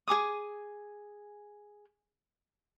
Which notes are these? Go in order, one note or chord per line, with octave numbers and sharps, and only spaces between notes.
G#4 G#5 D6 D#6